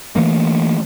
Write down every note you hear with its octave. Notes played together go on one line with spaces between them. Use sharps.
E3 A3 A#3